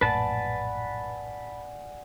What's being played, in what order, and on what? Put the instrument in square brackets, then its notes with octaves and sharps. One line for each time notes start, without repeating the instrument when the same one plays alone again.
[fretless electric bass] A#1 F#2 A2 [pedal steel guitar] B4 A5 [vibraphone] D5 F#5 G#5